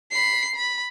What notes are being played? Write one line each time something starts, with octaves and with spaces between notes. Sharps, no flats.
B5 C7
B5